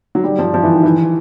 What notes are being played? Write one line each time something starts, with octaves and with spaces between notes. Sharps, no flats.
F#3
G3
F3
F3
E3
D#3
E3